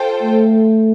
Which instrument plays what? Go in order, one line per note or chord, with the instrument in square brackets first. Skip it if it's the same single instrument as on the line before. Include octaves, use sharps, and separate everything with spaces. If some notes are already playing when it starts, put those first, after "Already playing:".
Already playing: [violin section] F4 A4 C5 G5
[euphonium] A3